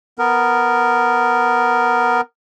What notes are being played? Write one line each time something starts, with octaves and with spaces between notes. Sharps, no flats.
B3 A#4